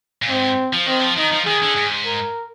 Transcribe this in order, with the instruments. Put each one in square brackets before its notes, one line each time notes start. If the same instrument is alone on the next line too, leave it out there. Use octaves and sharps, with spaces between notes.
[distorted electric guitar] A#2
[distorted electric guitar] G#2 [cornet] C4
[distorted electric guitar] F3
[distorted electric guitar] D#3 [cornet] C4
[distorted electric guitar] F3
[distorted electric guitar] D#3 [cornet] D#4
[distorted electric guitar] F3
[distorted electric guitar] D#3 [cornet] G#4
[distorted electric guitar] D3
G#2
[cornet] A#4